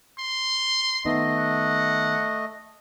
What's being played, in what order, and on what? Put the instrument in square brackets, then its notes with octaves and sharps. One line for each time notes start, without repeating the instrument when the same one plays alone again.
[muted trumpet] C6
[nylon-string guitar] D#3 B3 D#4 [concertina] A3 D#5
[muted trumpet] F#5